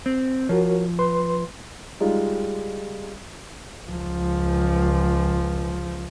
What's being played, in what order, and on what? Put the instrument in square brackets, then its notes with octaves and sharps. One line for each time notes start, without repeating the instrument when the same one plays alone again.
[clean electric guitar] C4
[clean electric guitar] F3 [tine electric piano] F#4 A#4 C#5
[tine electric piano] B4 C6
[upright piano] G3 G#3 D#4 F4
[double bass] C#2 F3